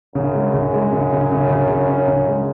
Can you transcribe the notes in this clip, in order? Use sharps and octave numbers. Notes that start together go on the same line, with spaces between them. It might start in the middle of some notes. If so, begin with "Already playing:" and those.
F#2 C#3
G#3
C#3
G#3
C#3
C#3
C#3
C#3
C#3
C#4
C#3
G#3